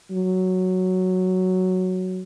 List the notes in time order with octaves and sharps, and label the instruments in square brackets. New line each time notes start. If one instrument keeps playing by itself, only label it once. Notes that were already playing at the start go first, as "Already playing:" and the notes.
[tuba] F#3